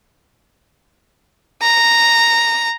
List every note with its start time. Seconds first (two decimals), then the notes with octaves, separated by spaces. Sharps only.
1.62 A#5